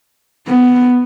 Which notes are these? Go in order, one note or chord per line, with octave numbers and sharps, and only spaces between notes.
B3